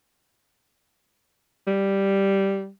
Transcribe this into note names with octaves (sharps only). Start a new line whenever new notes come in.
G3